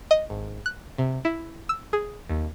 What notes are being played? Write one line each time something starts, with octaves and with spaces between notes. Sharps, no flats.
D#5
G#1
F#6
C3
E4
E6
G#4
D#2